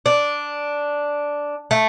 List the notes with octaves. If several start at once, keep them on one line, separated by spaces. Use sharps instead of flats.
D4
A3